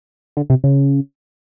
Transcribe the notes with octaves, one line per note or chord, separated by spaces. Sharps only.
D3
C3
C#3